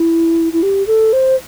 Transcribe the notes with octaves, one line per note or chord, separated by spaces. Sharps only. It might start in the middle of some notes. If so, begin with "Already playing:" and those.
Already playing: E4
E4
G4
A4
C5